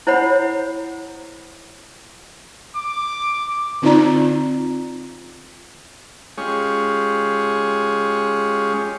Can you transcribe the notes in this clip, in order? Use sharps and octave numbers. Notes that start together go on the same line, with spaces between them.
E4 C5 C#5 F#5 B5
D6
D3 C4 D#4 F4 D5 A#5
G#3 C#4 F4 G4 G#4 C#5